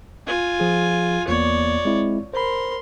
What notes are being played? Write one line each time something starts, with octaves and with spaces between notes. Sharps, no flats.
F4 G#5
F3 G#4
E2 A#3 B3 C#5 D5
G#3 C4 E4
A#4 C5 B5 C6